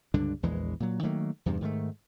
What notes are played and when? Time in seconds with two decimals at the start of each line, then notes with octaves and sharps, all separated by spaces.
0.14 C#2 G2 D3 D4
0.43 A#1 E2 E3 G#3
0.80 A#2 F#3
1.03 D#3 F#3 A3 A#3
1.46 E2 G2 C3
1.61 G#2 D#3 E3 A3